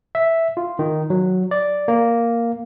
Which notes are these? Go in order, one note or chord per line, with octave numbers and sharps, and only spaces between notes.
E5
F4
D#3
F#3
D5
A#3